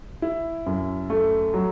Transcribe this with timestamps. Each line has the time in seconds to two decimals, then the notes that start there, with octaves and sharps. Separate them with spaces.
0.22 E4
0.66 F#2
1.10 A3
1.54 F#3